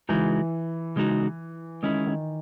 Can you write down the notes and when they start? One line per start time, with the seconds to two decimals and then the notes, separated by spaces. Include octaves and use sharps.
0.09 C#3 E3 G#3 D#4 F#4
0.96 C#3 G#3 D#4 F#4
1.83 D#3 G#3 C#4 E4
2.07 D#3